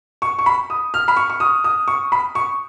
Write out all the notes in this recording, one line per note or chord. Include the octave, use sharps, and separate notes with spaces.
C#6
C#6
B5
D#6
F6
B5
C#6
C#6
D#6
D#6
C#6
B5
C#6